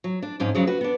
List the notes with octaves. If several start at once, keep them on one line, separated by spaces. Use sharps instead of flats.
F#3
D4
F2 G#2 C#4
F2 C#3 F#3 G#3
F#4 B4
B3 D4